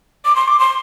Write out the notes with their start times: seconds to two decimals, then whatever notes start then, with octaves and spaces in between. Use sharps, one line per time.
0.25 D6
0.36 C6
0.48 D6
0.60 C6